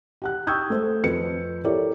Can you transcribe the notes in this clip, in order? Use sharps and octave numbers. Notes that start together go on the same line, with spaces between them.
G4 F#5 F#6
G5 C#6 D#6 E6 G6 G#6
A3 C5
F2 B4 C#7
E4 G4 A4 A#4 C#5 D5